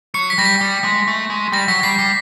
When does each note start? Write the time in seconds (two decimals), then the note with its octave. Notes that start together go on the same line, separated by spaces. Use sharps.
0.14 F#3 C#7
0.30 B6
0.38 G3 A#6
0.45 B6
0.61 G3
0.84 G#3
1.07 A3
1.30 G#3
1.52 G3 A#6
1.68 F#3 B6
1.83 G3 C7
1.99 G3